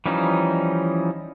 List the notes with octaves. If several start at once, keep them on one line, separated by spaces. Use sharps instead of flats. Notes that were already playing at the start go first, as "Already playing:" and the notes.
E3 F3 G3 C#4 D#4